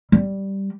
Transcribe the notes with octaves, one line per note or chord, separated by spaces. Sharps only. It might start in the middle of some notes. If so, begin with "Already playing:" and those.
G3